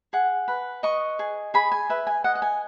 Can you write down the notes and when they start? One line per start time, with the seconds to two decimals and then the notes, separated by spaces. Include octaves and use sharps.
0.13 G#4 F#5
0.48 B4
0.83 D#5 C#6
1.19 G#4
1.54 G#4 B5
1.72 G#5
1.89 B4 E5
2.07 G#5
2.24 D#5 F#5
2.35 F#5
2.42 G#5